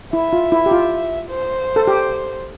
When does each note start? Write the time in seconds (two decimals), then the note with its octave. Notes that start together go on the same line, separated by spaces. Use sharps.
0.13 E4 E5
0.33 F4
0.52 E4
0.66 G4
0.71 F4
1.30 C5
1.76 A4
1.88 G4